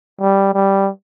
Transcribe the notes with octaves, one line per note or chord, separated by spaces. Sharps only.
G3
G3